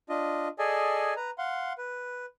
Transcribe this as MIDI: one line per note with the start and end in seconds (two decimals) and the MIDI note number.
0.09 0.48 62
0.09 0.48 65
0.09 0.48 75
0.59 1.14 68
0.59 1.14 69
0.59 1.14 74
0.59 1.14 75
0.59 1.14 80
1.16 1.31 71
1.16 1.31 82
1.38 1.73 77
1.38 1.73 78
1.38 1.73 84
1.78 2.26 71